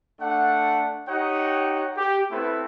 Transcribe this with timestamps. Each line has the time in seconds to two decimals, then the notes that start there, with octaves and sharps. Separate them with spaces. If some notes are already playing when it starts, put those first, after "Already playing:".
0.21 A3 D4 F#5
1.09 D#4 G4 C#5 F#5
1.97 G4
2.31 A3 B3 C4 E4 B4